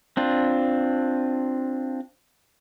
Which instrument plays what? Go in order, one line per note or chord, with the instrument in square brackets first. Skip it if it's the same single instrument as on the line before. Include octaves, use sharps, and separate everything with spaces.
[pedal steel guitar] C4 D4 F4